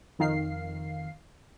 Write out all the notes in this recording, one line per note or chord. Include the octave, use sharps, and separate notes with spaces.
F2 D#3 F5 C7